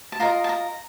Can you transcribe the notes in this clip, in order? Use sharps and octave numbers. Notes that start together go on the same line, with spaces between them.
A5
F4 A#4 D#5 A#5
A5
A#5